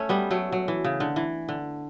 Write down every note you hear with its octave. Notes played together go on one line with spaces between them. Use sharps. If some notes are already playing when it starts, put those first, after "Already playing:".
Already playing: A3 C#4
G3 B3
F#3 A3
F#3
E3
C#3
D3
E3
D3